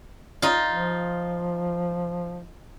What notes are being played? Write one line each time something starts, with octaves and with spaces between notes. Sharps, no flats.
D#4 F4
F3